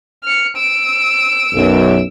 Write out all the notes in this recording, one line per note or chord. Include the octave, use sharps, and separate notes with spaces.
F6 C#7
E6 D7
B1 F#2